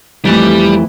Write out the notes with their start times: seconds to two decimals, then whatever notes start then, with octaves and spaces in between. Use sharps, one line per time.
0.25 F2 E3 G3 A3